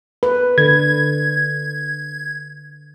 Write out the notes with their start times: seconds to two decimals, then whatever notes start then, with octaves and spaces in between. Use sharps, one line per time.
0.23 B4
0.58 D3 G#6